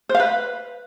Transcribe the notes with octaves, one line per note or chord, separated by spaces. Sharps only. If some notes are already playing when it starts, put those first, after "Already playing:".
C5
F5
B4